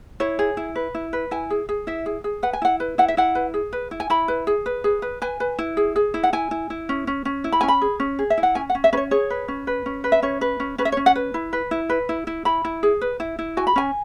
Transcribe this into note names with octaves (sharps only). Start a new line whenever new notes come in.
E4 C#5
G#4
E4
B4
E4
B4
E4 G#5
G#4
G#4
E4 E5
G#4
G#4
B4 F#5
G#5
E4 F#5
B4
E4 F#5
E5
E4 F#5
B4
G#4
B4
E4
G#5
E4 B5
B4
G#4
B4
G#4
B4
B4 G#5
B4
E4
G#4
G#4
E4
F#5
E4 G#5
E4
E4
C#4
C#4
C#4
E4
B5
C#4 G#5
B5
G#4
C#4
G#4
E5
E4
F#5
C#4 G#5
F#5
C#4
E5
C#4 B4 C#5
G#4 C#5
B4
C#4
B4
C#4
B4
E5
C#4 C#5
B4
C#4
C#4 B4
E5
C#5
C#4
F#5
B4
E4
B4
E4
B4
E4
E4
E4 B5
E4
G#4
B4
E4
E4
F#4 G#5
B5
C#4 G#5